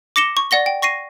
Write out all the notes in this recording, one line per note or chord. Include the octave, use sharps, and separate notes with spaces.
D6 A#6 C#7 E7 G7
C#6
D5 F#5 A#6 G7
G5
C#6 A#6 C7 D#7